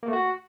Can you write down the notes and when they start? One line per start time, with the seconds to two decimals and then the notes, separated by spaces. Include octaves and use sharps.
0.03 A#3
0.08 A3
0.13 F#4